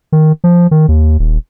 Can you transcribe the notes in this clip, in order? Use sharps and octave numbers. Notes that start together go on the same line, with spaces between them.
D#3
F3
D#3
D#2
D#1